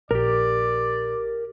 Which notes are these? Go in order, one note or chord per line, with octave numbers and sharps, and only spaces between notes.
A#1 G4 A#4 D5